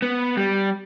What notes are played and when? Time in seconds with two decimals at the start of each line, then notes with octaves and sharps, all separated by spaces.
0.02 B3
0.37 G3